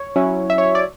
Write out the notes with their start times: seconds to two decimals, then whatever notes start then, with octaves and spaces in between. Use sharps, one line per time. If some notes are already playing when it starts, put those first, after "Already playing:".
Already playing: C#5
0.16 F#3 C#4 E4
0.50 E5
0.58 C#5
0.75 D5